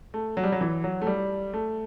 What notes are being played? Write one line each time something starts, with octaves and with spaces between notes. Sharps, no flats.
A3
F#3
G3
F#3
E3
F#3
A3
G3
A3